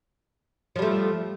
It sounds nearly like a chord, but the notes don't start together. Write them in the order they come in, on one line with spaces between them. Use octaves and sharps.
F3 G3 A3